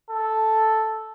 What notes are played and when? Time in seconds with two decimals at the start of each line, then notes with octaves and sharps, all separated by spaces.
0.11 A4